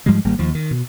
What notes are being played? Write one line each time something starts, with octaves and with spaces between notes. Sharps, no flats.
G#2 F3 G3 G#3
G#1 G3 A#3
D#2 F3
D#3
B2